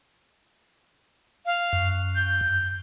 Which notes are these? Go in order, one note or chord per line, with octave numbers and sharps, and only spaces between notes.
F5
F#2
G6